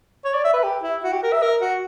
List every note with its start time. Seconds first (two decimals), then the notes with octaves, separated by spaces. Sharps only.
0.25 C#5
0.34 D5
0.45 E5
0.54 B4
0.64 G4
0.83 E4
1.03 F#4
1.13 G4
1.23 A#4
1.33 E5
1.43 A#4
1.62 F#4